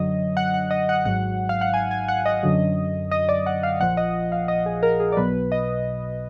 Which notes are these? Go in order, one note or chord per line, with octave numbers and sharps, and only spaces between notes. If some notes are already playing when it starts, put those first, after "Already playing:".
Already playing: F#2 D3 F#3 D#5
F#5
F#5
D#5
F#5
G#1 G#2 F#3 F#5
F5
F#5
G#5
G#5
F#5
D#5
F#2 D3 F#3
D#5
D5
F#5
F5
A#1 A#2 F3 F#5
D#5
F5
D#5
G#4
A#4
G#4
D5
B1 B2 F#3 B4
D#5